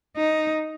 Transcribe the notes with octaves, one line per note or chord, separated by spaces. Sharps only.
D#4